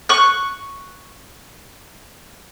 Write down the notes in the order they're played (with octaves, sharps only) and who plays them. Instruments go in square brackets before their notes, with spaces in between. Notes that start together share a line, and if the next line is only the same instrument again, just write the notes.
[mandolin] C#6 F#6